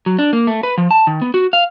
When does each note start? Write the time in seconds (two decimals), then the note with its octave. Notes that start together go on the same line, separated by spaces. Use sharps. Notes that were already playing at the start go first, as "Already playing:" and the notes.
0.06 F#3
0.19 D4
0.33 A#3
0.47 A3
0.63 B4
0.78 F3
0.91 A5
1.07 D#3
1.22 B3
1.34 F#4
1.53 F5